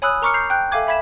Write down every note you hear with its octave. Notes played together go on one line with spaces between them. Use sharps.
C#5 G#5 B5 D#6 E6 F#6
A#4 A#5 C#6 D6 F6 C#7
G6 C7 F7
G5 F#6 G6
A4 E5 F5 G#5 D6 G#6
E5 B5 G#6 B6 E7